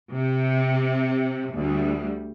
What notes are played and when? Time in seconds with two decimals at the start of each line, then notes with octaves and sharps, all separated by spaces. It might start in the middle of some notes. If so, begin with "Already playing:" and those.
0.12 C3
1.54 D2 G3